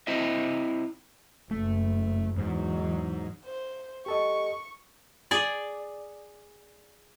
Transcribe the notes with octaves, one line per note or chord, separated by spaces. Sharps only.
C4 E4 C5 D#5 E5
F#1 A3
E2 G#2 F#3
C5
G4 A4 D#5 C#6
G#4 D5